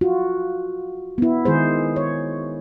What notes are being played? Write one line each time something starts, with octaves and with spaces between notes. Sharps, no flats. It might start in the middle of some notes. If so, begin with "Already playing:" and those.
F4 F#4
B3 E4
D#3 G#3 G#4 C5
C#5